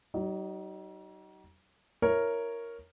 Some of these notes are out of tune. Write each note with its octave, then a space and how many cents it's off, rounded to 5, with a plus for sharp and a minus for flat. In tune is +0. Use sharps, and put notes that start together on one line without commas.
F#3 +45 D#4 +0
E4 -10 A#4 +0 C#5 +0